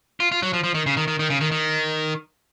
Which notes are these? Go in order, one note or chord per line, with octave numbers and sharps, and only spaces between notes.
F4
F4
F#3
F3
F3
D#3
C#3
D#3
D#3
D#3
C#3
D#3
D#3